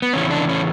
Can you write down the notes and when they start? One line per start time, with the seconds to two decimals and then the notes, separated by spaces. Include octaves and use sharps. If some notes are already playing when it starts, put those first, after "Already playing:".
0.02 B3
0.13 E2 C#3 E3 C#4
0.31 D4
0.49 C#4